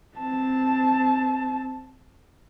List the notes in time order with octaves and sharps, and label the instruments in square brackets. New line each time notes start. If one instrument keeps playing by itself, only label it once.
[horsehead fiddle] C4 A5